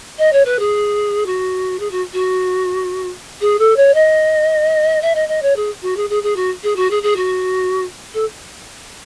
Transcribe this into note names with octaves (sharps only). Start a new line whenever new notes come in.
D#5
C#5
B4
G#4
F#4
G#4
F#4
F#4
G#4
A4
C#5
D#5
E5
D#5
D#5
C#5
G#4
F#4
G#4
G#4
G#4
F#4
G#4
F#4
G#4
G#4
F#4
A4